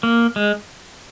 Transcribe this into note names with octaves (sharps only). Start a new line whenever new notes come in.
A#3
G#3